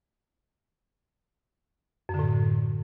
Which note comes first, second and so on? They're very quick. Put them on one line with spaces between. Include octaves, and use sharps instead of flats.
F#2 D3 A2